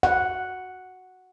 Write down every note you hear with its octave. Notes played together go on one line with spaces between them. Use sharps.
F#5